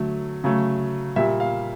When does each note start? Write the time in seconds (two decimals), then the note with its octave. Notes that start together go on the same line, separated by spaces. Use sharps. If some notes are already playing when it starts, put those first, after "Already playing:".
Already playing: D3 F#3 A3
0.44 C#3 F#3 A3
1.16 A#2 G3 E5
1.40 F5